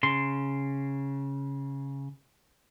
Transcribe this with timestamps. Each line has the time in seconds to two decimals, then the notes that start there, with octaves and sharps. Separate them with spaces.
0.03 C#3 C6